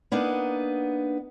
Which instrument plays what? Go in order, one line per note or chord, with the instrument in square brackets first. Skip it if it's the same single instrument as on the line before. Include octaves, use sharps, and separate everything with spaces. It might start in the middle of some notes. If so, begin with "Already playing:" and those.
[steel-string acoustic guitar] A#3 B3 D4 D#4